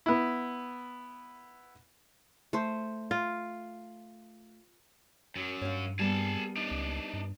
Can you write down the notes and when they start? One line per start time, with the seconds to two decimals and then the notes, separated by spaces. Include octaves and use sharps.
0.06 B3 E4
2.53 A3 C5
3.11 F4
5.36 F#2 F#3
5.62 G2 C#5 F5
5.99 G3 A#3 B3 G#4 A5
6.56 D4 D#4
6.71 C#2
7.13 G2